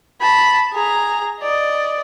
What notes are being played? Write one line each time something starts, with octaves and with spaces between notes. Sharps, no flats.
A5 B5
G#4 A#5
D5 D#5